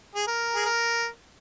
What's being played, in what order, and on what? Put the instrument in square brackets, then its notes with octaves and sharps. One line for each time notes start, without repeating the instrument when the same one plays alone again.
[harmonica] G#4
A#4
G#4
A#4